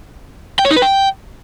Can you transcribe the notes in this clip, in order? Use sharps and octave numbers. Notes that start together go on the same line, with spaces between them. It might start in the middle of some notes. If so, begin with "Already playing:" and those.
G5
C#5
D#4
B4
G5